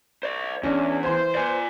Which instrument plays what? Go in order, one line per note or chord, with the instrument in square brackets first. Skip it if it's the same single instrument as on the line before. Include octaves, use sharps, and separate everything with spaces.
[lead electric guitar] C5 D5
[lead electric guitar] E2 [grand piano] C#4 D4
[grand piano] E3 C6 G#6 [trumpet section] C5
[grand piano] B4 [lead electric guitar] D5 G#5